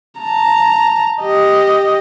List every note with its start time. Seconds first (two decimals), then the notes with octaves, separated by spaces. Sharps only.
0.21 A5 A#5
1.22 G4 D#5